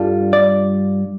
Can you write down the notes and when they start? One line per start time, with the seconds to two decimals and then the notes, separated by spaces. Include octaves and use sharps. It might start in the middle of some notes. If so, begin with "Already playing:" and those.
Already playing: G2 G3 D4 F4 A4
0.33 D5